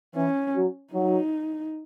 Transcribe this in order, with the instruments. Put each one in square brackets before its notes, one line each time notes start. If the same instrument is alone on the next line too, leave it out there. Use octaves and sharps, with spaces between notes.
[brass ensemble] E3 [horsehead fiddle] C#4
[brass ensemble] F#3
[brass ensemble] F#3 [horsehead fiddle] D#4